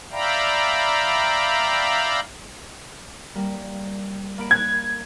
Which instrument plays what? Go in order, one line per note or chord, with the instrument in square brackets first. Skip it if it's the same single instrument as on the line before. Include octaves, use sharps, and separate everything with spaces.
[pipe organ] D5 E5 F5 G5 A#5 B5
[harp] G3 A#3
A#3 B5 D7
[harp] F#6 [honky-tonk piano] G#6